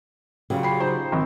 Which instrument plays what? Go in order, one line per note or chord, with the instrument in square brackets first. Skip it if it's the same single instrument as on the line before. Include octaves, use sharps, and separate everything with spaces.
[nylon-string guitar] C#3 F#3 [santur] G3 F4
[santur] G4 [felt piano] B5 C7
[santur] D#4 [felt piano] C5
[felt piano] G#1 C4